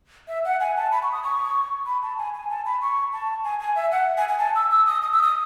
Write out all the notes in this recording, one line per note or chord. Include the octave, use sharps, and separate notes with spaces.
E5
F#5
G#5
A5
B5
C#6
D#6
C#6
B5
A5
G#5
G#5
A5
B5
C#6
A5
G#5
G#5
E5
F#5
G#5
G#5
A5
E6
E6
D#6
D#6
E6
D#6